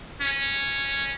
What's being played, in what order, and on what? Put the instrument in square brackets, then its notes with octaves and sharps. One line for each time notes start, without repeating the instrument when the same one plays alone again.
[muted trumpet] C#4